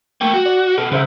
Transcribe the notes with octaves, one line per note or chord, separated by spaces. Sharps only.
A3 A#3 G5
F#4
D5
B2 A4
C2 C#3 C5 E5